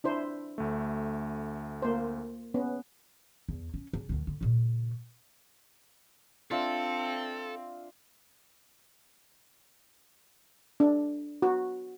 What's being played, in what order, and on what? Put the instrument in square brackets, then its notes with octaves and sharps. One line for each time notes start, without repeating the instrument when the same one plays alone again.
[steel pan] D4 E4 C5
[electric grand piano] D2 A3
[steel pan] A#3 C5
B3 C#4
[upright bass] E2
C#4
C#3
D2 D#3
D3
A#2 C#3
[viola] C4 [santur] D4 F4 E5 [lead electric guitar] A4
[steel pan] D4
F#4